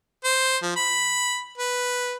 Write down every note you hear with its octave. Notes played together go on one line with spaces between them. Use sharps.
C5
F3
B5
B4